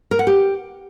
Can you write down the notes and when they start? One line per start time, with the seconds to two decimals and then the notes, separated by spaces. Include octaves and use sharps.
0.11 A#4
0.19 F#5
0.27 G4